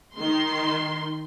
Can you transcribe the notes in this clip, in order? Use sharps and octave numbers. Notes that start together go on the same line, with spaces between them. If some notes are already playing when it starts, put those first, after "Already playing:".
D#3 C6